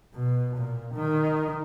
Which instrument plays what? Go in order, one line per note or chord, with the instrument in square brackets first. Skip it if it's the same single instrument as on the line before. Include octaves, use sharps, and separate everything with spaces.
[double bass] B2
A#2
D#3